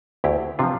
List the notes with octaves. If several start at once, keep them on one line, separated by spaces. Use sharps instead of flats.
D2 E4 G4
C3 F3 D4 F4